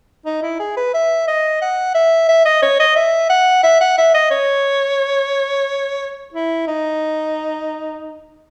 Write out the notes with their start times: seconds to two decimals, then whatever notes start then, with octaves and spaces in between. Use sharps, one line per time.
0.26 D#4
0.43 E4
0.60 G#4
0.77 B4
0.94 E5
1.28 D#5
1.62 F#5
1.94 E5
2.29 E5
2.45 D#5
2.62 C#5
2.80 D#5
2.96 E5
3.30 F#5
3.63 E5
3.81 F#5
3.98 E5
4.14 D#5
4.30 C#5
6.34 E4
6.67 D#4